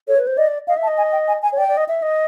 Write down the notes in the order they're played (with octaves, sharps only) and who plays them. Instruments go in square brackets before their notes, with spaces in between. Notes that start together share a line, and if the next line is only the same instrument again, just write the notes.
[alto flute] A4 [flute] C#5
[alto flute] B4
C5
[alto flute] D5 [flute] D#5
[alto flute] D#5 [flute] F5
[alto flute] E5
[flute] A5
[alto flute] D#5
[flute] G#5
G5
G#5
G#5
[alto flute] C#5
[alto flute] D5 [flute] G5
[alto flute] D5
D#5
E5
D#5